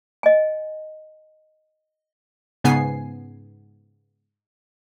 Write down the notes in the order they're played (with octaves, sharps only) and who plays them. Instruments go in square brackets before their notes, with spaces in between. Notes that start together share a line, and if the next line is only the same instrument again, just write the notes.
[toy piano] D#5 G#5
[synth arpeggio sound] G#2 C#3 B3 G#5 C7